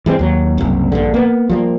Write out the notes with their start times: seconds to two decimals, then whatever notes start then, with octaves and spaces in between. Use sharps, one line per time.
0.06 E3 G3 G#3 C4
0.19 D#2 F#3
0.58 F#1 C2
0.92 A#1 G2 D3
1.14 A#3 B3
1.50 F3 G3 A#3